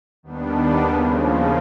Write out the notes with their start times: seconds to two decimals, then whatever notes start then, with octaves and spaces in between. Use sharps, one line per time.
0.23 D#2 D#3 G3 B3 D4
0.81 D#2 C#3 F3